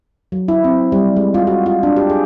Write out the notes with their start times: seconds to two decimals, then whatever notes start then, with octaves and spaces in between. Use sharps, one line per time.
0.32 F#3
0.48 E4
0.64 C4
0.92 G3
1.16 G#3
1.34 F4
1.47 F#4
1.66 F4
1.83 D4
1.97 G4
2.10 G#4